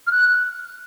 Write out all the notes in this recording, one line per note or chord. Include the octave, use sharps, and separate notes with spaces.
F6
F#6